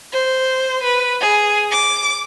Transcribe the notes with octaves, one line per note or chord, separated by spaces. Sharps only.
C5
B4
G#4
D6